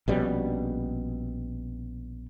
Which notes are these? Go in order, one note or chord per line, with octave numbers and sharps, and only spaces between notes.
A#1 B2 G3 C#4